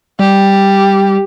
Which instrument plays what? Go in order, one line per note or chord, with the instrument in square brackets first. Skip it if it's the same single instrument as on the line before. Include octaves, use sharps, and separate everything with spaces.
[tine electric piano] G3 [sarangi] G4